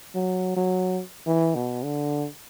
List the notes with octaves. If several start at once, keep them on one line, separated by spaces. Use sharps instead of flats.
F#3
F#3
E3
B2
D3